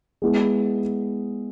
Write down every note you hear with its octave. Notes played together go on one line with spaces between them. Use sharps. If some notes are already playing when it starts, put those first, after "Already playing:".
G#3 B3 E4 G#4